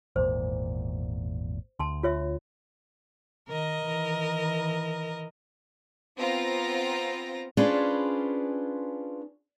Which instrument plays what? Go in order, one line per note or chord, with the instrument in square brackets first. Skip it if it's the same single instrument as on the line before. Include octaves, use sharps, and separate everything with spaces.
[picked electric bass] G#1 E2 A#2 [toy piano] C5
[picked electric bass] D2 [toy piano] A5 C6
[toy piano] F4 C#5 E5
[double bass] D#3 [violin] A#4 D#5
[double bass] D#3 E3
[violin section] B3 C4 F4 A#5 A#6
[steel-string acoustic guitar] C#4 D4 F4 G#4 B4 C5